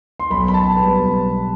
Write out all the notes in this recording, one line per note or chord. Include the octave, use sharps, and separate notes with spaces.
C6
B1 B5
B2 B5
A5
B1
B4
G3
B1
B2